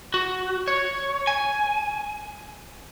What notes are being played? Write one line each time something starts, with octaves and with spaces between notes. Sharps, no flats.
F#4
C#5
G#5